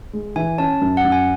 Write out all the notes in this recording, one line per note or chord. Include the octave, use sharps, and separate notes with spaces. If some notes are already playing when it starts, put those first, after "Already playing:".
G#3
E3 G#5
C#4 A5
F#2
F#5
F#2
G#5